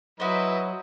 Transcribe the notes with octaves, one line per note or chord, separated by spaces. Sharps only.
F#3 E4 F#4 B4 C5 D#5